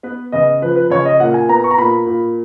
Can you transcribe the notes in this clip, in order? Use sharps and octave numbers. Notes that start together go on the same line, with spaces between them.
B3 B4
C#3 D#5
F3 B4
B4
C#3 C#5
D#5
A#2 F#5
G#5
B3 A#5
C#6
A#5
A#2 B5
A#2